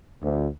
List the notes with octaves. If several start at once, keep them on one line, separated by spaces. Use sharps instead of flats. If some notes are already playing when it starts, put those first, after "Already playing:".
D2